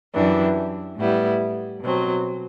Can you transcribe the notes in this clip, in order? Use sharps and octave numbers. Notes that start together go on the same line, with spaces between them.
F#2 E3 G3 D4
A2 G3 B3 E4
B2 F#3 C4